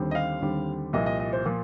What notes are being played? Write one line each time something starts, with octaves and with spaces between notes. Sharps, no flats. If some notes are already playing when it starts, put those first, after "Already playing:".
Already playing: D#2 D3 G3 C4
D#5
F5
D#2 D3 G3 C4
C2 A#2 F3 D#5
D#5
D#5
C5
A#2 F3